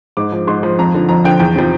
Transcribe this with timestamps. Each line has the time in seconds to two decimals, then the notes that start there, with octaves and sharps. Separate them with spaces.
0.17 G#2 D6
0.32 F3
0.47 G#2 C6
0.63 F3
0.79 F2 A#5
0.94 D3 F3
1.09 F2 A#5
1.24 D3 F3 G5
1.40 E2 G5
1.56 C3 F3